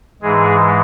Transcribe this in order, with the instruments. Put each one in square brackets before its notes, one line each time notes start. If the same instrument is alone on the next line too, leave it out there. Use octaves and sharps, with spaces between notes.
[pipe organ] G#2 E3 G#3 G#4